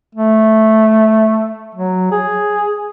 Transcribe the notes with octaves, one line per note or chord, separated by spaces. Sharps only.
A3
F#3
G#4